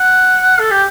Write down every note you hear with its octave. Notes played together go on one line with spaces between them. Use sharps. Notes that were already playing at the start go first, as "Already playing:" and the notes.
Already playing: F#5
A4
G4